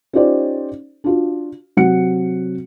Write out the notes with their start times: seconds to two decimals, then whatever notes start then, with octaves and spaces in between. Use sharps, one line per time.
0.13 C#4 D#4 F4 G4 C5 D5
1.04 D4 F4 F#4
1.77 C3 F#3 F#5 C#7